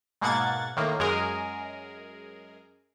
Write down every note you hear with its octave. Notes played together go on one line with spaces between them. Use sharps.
G#2 B2 A#3 F#5 G#6 A6
A2 D#3 A#3
F#2 G#3 G#4 A#4